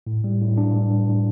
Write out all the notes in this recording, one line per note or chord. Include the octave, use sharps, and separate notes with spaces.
A2
G3
A2
D4
A2
G3
A2